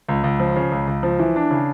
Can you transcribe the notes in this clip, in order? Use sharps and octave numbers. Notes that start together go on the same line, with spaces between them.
C#2
C#2
F3
C#3
C#2
C#2
F3
E3
D4
C#3